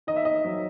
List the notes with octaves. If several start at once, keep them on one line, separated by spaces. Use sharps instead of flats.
D#3 D#5
E5
D#3 D#5
F#3